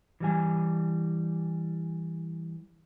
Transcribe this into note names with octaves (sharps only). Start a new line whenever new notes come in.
E3 G3 G#5